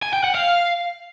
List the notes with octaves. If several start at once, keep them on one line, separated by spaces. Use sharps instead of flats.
G#5
G5
F#5
F5